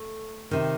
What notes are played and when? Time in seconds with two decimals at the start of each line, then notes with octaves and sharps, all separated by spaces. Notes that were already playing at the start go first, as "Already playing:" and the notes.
Already playing: A3
0.51 C3 D#3